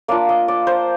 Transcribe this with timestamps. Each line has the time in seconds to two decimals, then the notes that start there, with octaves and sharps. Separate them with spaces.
0.08 A#3 D4 F4 D5
0.29 D#5
0.48 D5
0.67 C5